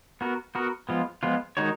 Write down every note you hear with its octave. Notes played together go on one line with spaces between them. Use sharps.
B3 F#4 A#4
B3 F#4 A#4
F3 G#3 B3 F4
F3 G#3 B3 F4
D#3 G#3 D#4 F#4 C#5